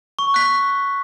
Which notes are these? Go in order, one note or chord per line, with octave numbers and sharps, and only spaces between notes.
C#6
F#6 B6